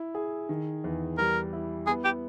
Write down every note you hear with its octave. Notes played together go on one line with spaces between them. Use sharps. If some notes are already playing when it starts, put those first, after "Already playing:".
Already playing: E4
G#4
D#3
E2
G3 A#4
E4
B3 G#4
G4